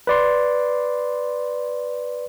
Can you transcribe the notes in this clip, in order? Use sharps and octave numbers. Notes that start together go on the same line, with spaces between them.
B4 D5 C6